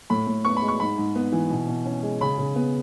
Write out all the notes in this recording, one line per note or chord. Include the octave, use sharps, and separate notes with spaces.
A2 B5
A2
B3 C#6
B5
G#3
C#6
G#2 B5
G#2
B3
E3
B2
B2
C#4
G#3
C#3 B5
C#3
B3